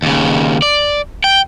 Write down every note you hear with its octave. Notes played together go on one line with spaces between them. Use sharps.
D#2 C#3
D5
G5